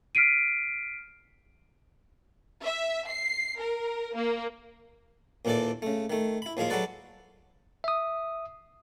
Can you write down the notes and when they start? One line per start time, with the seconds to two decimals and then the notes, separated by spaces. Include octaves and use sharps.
0.15 F6 B6 C7 D7 D#7
2.63 E5
3.09 C7
3.61 A#4
4.15 A#3
5.45 D#2 A#2 E3 D4 A4 D5
5.82 C#3 A3
6.10 D#3 A3
6.42 E4 B5
6.57 D#2 F3 G#3 G#4 F5
6.70 F#3 G#3 F#4 A4 B4 D5
7.84 E5 D#6